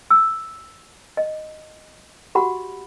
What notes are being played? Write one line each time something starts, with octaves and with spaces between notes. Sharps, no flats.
E6
D#5
F#4 G4 F#5 B5